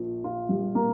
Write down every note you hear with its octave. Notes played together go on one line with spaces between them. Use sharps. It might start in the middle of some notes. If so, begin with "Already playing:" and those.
Already playing: A#1 A#2 F3
F4
G3
A#3